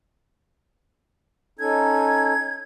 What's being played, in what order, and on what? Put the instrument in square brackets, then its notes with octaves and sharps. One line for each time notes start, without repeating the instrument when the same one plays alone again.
[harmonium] C#4 D#4 A4 [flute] G#6